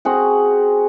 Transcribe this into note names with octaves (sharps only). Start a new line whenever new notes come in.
C4 F#4 G#4 F#5